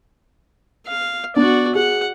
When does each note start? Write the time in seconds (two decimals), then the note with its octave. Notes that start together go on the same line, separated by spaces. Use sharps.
0.87 F5
1.36 B3 D4 F#4 D5
1.75 G#4 F#5